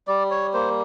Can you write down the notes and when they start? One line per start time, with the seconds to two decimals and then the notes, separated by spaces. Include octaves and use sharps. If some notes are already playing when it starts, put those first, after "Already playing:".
0.07 G3 D5
0.31 C#5
0.53 A#3 C5